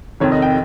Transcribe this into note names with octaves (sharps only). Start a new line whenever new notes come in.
F1 F2 D#3 C#5
D#5
G5